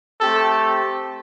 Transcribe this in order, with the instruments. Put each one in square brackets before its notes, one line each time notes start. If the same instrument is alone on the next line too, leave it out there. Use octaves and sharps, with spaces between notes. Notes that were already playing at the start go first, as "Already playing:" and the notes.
[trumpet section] A3 C4 G4 A4